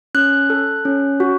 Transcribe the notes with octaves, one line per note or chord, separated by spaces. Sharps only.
C#4 F#6
A4
C#4
F#4